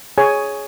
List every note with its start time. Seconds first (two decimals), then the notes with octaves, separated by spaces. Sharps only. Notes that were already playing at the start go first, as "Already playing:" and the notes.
0.18 G#4 C#5 G#5